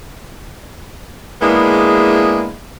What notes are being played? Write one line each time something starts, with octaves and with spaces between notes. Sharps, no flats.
G#3 A#3 B3 D4 E4 G#4